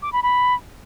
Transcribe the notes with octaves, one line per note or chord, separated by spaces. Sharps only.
D6
B5
B5